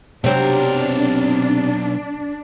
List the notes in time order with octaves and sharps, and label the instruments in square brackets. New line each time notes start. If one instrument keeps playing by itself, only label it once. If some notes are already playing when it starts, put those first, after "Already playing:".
[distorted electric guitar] B1 A#4 [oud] C3 F#3 C4 [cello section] D4